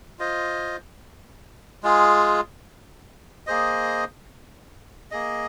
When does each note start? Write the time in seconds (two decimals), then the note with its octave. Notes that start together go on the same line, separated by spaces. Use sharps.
0.19 F4 C5 D#5
1.83 G#3 F4 G#4
3.47 A#3 G#4 C5 D#5
5.11 A#3 G#4 D#5